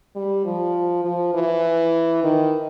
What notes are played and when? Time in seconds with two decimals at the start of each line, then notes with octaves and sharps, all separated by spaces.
0.15 G3
0.45 F3
1.05 F3
1.34 E3
2.24 D#3